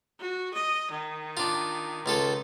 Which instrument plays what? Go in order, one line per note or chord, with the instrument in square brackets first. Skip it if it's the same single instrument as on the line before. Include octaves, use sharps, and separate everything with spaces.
[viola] F#4
D#5
D#3
[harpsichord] D4 F4
C#2 F4 A4